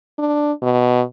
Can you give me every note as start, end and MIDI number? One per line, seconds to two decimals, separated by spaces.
0.18 0.52 62
0.62 1.02 47